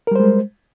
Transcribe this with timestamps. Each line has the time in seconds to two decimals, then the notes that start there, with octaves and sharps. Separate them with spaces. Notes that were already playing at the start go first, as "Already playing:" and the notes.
0.07 A#4
0.11 G3
0.15 C5
0.20 G#3